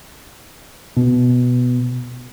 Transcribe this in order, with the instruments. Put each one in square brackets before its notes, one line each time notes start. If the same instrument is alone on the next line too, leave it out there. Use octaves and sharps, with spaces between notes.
[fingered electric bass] B2